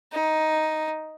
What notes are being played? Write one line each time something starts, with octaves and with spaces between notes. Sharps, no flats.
D#4